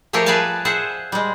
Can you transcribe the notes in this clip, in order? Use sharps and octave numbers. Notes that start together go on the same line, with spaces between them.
F3 A3 G4 G#4 A#4 C#5
G#4 B4 D5 F5 G#5 A5
G#4 C5 E5 F#5
G3 G#3